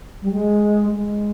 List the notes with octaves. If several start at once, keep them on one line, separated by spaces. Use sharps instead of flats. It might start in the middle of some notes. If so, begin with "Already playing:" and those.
G3
G#3
G#3